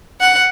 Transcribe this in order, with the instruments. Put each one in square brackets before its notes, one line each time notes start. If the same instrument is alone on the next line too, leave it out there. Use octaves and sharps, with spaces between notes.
[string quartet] F#5